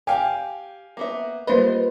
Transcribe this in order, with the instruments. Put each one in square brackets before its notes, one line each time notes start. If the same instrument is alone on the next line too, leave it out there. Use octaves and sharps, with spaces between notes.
[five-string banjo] G4 [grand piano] F5 G5 G#5
[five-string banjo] A#3 B3 E5
[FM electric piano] G3 A#3 B4 [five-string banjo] F4 C5 D#5